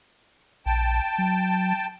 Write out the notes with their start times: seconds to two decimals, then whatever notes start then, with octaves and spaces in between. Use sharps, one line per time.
0.66 A#1 G5 A5
1.18 F#3